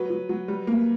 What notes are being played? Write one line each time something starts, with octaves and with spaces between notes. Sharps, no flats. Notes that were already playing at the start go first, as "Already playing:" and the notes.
Already playing: F#3 B4
F#3
F#3
G3
A#3